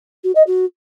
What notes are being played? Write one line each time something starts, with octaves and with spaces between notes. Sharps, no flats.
F#4
D#5
F#4